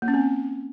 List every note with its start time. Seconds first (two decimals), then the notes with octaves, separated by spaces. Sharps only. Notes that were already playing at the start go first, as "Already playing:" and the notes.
0.02 A#3
0.08 C#4
0.14 C4